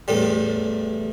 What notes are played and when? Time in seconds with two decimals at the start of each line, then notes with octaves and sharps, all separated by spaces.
0.08 A1 E2 A2 G3